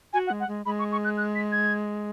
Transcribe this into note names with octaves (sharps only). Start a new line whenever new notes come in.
F#4 G#5
F#5
G#3
F#5
G#3
G#3 B5
C#6
C#6
F#6
F#6
B6
G#6